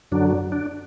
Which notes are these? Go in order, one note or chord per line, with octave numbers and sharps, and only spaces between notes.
F#2 D3 F#3 D4
D4